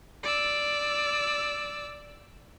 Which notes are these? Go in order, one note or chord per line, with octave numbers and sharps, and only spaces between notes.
D5 E6